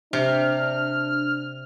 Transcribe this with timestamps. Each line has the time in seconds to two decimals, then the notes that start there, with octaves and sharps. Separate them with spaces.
0.13 C3 D4 F6